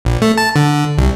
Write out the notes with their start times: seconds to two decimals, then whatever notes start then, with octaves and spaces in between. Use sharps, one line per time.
0.05 A#1
0.22 A3
0.38 A5
0.56 D3
0.98 C2